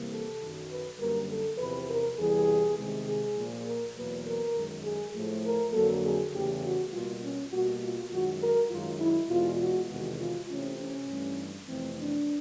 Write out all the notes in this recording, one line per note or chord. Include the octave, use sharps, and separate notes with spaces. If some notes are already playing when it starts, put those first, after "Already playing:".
Already playing: C3 E3 G3 A#3
A4
F#2 D#3 F#3
B4
F#2 D3 G3 A#3 A#4
A4
E2 C3 F3 B4
A#4
E2 C3 E3 G3 G#4
C3 D#3 G#3
G#4
A#2 F3 A#3
A#4
E2 B2 F#3 A#3 B4
A#4
F#2 D#3 G#3
G#4
A2 F3 A3
A#4
F2 D3 F#3 A#3 A4
G#4
E2 C#3 E3 A3 G4
F#4
B2 G3 A#3 F4
C#4
B2 G3 A#3 F#4
F4
F#2 D#3 G#3 F#4
A#4
F#2 D#3 G#3 F4
E4
E2 B2 G#3 F4
F#4
E2 C3 D#3 G#3 F#4
F4
C3 E3 A3 C#4
C#4
G2 E3 A3
F2 C3 E3 A3 C4
D4